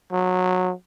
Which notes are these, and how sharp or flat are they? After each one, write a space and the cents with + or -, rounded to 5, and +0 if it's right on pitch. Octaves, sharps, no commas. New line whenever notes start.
F#3 -20